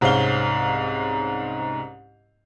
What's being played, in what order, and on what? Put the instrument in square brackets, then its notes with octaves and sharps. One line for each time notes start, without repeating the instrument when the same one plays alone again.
[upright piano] C2 G#2 C4 C#4 F5 G7